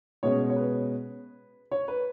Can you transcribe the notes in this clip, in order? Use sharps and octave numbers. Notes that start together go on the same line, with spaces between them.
B2 G#3 C#4 C#5
C#5
B4
C#5
B4